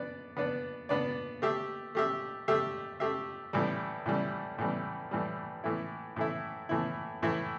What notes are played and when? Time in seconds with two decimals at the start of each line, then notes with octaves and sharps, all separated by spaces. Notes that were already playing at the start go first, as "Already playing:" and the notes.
Already playing: B3 D4 B4 D5
0.37 B3 D4 B4 D5
0.89 B3 D4 B4 D5
1.42 A3 G4 E5
1.95 A3 G4 E5
2.48 A3 G4 E5
3.00 A3 G4 E5
3.53 A2 E3 G3
4.06 A2 E3 G3
4.58 A2 E3 G3
5.11 A2 E3 G3
5.64 A2 E3 A3 E4
6.16 A2 E3 A3 E4
6.69 A2 E3 A3 E4
7.22 A2 E3 A3 E4